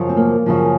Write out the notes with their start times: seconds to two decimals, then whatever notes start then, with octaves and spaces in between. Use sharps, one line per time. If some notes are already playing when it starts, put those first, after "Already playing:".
Already playing: F#2 C#3 F3
0.09 C4
0.17 A#3
0.46 F#2 C#3 F3